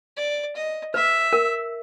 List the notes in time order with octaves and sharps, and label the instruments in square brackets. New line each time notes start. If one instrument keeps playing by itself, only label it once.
[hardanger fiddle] D5
D#5
[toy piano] B4 [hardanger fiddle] E5
[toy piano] A#4